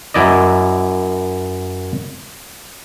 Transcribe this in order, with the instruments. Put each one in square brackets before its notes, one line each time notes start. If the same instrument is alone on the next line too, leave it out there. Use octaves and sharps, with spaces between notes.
[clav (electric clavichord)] F#2 E4 D5 D#5